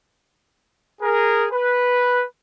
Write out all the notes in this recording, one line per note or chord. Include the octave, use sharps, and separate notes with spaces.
G#4 A#4
B4